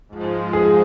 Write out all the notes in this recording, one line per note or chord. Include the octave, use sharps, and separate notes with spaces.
G#2 F3 G#3
G#4